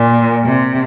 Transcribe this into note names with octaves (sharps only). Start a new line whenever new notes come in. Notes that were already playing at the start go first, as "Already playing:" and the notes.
Already playing: A#2
C3